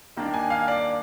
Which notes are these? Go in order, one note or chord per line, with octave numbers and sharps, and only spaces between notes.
D#2 D#3 A#3 D4
G#5
F5
D5